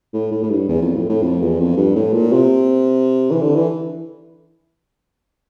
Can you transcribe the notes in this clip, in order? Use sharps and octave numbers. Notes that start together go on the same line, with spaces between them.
A2
A2
A2
G2
E2
F2
A2
A2
F2
E2
F2
G2
A2
A#2
C3
E3
D3
E3